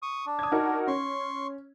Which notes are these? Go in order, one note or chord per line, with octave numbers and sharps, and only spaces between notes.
C#6 D#6
D4
D#6 G#6
D#4 F#4 A#4
C#4 C6 C#6